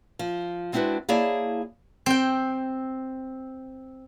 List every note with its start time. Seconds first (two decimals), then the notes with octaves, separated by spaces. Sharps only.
0.19 F3
0.73 G#3 C4 D4 E4 F#4 B4
1.09 A#3 E4 G#4 C#5 D5 A5
2.06 C4 G5